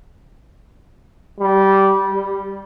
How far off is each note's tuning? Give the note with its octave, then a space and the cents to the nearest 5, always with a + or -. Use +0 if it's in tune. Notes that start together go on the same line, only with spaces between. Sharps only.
G3 -15
G3 +10